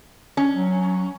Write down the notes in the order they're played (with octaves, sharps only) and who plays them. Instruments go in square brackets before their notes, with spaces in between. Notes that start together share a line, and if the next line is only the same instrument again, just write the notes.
[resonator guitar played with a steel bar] C#4
[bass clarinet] F#3